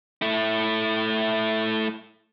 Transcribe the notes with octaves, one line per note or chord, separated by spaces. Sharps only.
A3 E4